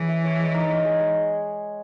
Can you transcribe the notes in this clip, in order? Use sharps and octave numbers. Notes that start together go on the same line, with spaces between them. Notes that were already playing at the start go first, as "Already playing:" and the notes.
Already playing: E3 C#4 G#4
E5
C#5
G#3
D#4
D#5
G#4
G#3